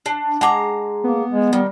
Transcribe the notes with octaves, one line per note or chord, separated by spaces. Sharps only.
D4
G#3 F#5 A5 A#5 D6
A#3 B3
G#3
D#3 G3